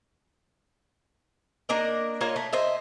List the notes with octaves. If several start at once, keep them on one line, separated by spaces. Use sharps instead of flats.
A#3 D4 A#4 D#5
A#3 F4 C#5 D#5
A3
C5 D#5 E5